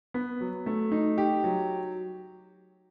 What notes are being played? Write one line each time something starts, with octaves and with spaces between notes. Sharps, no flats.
B3
F#3
A3
D#4
G4
F#3